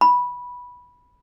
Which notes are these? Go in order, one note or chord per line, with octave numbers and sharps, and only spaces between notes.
B5